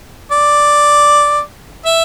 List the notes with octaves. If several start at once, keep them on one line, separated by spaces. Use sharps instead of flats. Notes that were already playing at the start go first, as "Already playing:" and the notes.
D5
E5